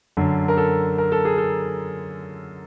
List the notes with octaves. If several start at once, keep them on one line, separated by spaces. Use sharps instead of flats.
F#2 D3
A#4
A4
A#4
A4
G#4
A4